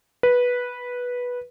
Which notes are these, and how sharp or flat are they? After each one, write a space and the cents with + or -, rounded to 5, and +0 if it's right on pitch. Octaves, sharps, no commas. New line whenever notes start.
B4 -10